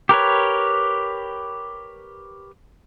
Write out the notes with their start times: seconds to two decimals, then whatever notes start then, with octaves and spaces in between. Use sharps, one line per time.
0.09 G4 A#4 B4 C#5